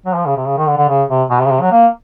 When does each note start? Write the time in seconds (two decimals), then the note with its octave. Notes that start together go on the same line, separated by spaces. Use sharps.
0.06 F#3
0.15 F3
0.26 C#3
0.37 C3
0.46 C#3
0.58 D#3
0.67 D3
0.77 D3
0.89 C#3
1.09 C3
1.30 B2
1.40 C3
1.46 C#3
1.51 C3
1.61 F#3
1.72 A#3